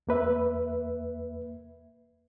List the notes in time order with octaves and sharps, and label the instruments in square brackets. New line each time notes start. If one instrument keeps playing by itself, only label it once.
[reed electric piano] E2 A#3 B4 E5